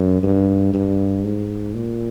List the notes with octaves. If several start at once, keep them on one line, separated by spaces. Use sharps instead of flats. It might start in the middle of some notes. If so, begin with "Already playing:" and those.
Already playing: F#2
G2
G2
G#2
A#2